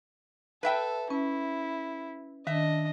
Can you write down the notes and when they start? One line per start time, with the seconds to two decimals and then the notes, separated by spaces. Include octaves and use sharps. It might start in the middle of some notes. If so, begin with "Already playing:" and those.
0.63 A4 B4 E5 G5
1.10 C#4 E4
2.47 D#3 D4 D#5 E5